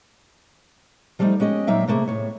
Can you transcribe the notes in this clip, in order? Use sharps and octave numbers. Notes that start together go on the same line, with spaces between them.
F3 G3 A3 C#4 D#4
G#3 C#4 G4 D#5
A#2 F#3 A#3 D#4 E5 G5
C3 A3 A#3 G#4
A2 C#5